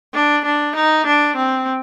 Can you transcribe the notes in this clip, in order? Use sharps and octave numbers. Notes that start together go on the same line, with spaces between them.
D4
D4
D#4
D4
C4